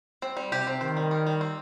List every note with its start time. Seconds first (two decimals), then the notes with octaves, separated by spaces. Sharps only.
0.22 C4
0.37 G3
0.52 C3 G4
0.67 C4
0.81 D#3 C5
0.97 G3
1.11 G3
1.27 G3
1.41 C4